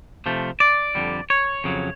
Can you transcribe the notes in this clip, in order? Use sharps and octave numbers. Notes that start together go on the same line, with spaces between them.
C3 F3 A3
D5
F2 D3 G3
C#5
F2 C#3 F#3